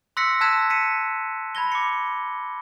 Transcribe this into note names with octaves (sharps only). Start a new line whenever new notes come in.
C6 E6 F#6 A#6 B6 C#7
A5 E6 F#6 G#6 B6 E7
B6 C#7 D#7 E7
B5 G#6 A#6 G7
D6 C#7